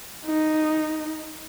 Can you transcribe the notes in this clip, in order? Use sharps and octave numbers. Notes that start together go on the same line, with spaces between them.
D#4